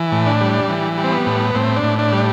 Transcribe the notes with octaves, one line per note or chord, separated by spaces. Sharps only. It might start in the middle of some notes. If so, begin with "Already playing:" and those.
Already playing: E3
A2
D4
G3
E3
G3
C4
B3
A2
A2 C4
D4
A2
D4
G3